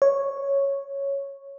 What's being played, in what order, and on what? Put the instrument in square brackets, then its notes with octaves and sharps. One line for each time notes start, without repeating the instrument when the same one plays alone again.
[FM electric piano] C#5